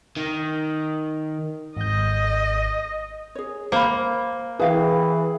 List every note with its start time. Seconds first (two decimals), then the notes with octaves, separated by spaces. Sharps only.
0.17 D#3
1.77 G#1 D#5 G6
3.35 G#4 C#5
3.72 A#3 C5 F5 B5
4.59 E3 G#4 B4 F5 G5